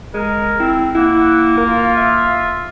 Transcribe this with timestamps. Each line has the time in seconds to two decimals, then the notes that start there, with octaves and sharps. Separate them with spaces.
0.14 G#3 A#4
0.60 C4 E4
0.95 A#3 E4 F#5
1.57 F4 A#4
1.97 E5